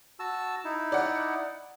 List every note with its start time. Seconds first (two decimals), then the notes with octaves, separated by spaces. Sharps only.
0.19 F#4 A5 E6
0.65 D#4 E4
0.92 D5 F#5